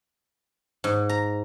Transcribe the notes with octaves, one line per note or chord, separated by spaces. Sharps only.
G#2
A#5